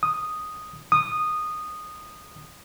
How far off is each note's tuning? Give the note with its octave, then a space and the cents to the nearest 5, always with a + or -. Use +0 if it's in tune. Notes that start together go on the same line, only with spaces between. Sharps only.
D#6 -5
D#6 -15